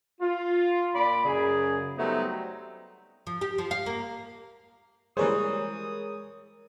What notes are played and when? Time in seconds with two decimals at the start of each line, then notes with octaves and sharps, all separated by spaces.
0.20 F4
0.94 A#2 D5 B5
1.25 F#2 C#3 G#4
1.98 F#3 G3 A3 B3 C4 D#4
3.27 F3
3.41 G4
3.58 F3
3.71 F5
3.86 A#3
5.17 E3 G3 G#3 G#4 A#4 C5 C#5 D#6